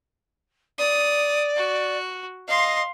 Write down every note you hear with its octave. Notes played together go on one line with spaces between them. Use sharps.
D5 D#6
F#4
D#5 F5 C6